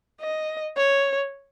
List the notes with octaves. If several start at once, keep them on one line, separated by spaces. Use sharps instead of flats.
D#5
C#5